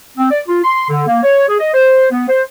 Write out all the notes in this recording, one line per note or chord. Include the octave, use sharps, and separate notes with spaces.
C4
D5
F4
C6
D3
A#3
C#5
G#4
D#5
C5
B3
C5